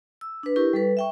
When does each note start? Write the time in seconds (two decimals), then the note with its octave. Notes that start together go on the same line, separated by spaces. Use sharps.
0.21 E6
0.43 D4 B4
0.56 E4 G4 A#4 C#6
0.73 G3 A4 B4
0.97 E5 G5 C#6